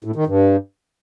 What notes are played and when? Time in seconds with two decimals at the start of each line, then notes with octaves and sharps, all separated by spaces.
0.04 A2
0.16 D#3
0.27 G2